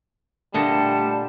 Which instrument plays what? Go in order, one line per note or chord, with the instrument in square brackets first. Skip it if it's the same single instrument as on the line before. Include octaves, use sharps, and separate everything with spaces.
[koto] A#2 D3 D#5 [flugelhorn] G3 [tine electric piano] A3 C#7 [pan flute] A5